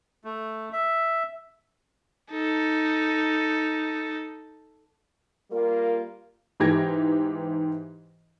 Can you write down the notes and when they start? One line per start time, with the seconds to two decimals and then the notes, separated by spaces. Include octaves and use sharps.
0.24 A3
0.73 E5
2.32 D#4 A4
5.51 G3 A#3 F4 A#4
6.60 G#2 E3 G4 G#6 A#6